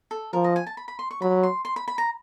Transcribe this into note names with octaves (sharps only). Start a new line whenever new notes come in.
A4
F3 A#4
D#5
G#5
A5
B5
B5
C6
C#6
F#3 B5
C6
C6
B5
B5
A#5